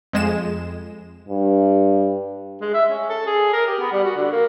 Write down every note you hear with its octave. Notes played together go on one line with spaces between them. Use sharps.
F2 G#3 E7
G2
G#3
E5
C#4
A4
G#4
A#4
G4
B3
G3
F#4
D3
A#3